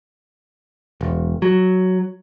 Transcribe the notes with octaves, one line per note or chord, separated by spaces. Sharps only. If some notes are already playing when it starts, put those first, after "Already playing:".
E1
F#3